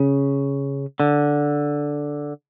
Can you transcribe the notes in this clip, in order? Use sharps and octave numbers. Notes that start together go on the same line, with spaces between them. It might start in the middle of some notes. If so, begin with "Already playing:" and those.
Already playing: C#3
D3